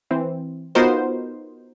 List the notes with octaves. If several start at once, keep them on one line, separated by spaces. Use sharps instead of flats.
E3 C4
B3 D#4 F4 F#4 A#4 C5